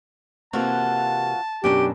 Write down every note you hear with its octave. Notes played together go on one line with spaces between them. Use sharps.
C3 E3 A#3 F4 F#4 A5
F#2 B2 D4 G4